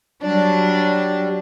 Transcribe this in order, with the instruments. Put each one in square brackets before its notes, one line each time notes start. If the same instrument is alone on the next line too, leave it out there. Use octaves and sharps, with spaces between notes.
[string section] F#3 D4 [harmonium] G3